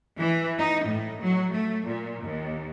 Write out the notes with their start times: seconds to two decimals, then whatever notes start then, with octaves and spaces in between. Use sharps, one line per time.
0.19 E3
0.59 D#4
0.89 A2
1.22 F#3
1.54 A3
1.87 A#2
2.24 D#2